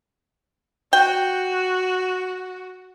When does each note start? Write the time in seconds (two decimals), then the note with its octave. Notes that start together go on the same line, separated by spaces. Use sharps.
0.93 F#4 G5